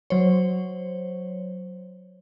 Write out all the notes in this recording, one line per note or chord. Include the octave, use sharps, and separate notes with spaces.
F#3 C5 C#5